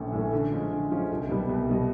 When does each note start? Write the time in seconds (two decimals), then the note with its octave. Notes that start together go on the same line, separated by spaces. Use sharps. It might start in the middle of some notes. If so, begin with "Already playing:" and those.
Already playing: A#1 A2 E3 A3 C#4
0.12 A2 E3 A3 C#4
0.33 D3
0.51 F3 G#3 C#4 F4
0.71 D3
0.91 F3 G#3 C#4 F4
1.11 C2
1.29 B2 G3 B3
1.49 C2
1.69 B2 G3 B3